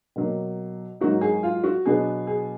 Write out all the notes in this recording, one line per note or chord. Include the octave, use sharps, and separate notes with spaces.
B2 F#3 A#3
G#2 F#3 A#3 D#4 F#4
G#4
F4
F#4
B2 F#3 B3 D4 G#4
G#4